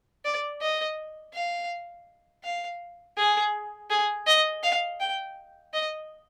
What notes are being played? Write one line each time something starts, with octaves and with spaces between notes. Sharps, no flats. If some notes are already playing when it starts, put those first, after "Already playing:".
D5
D#5
F5
F5
G#4
G#4
D#5
F5
G5
D#5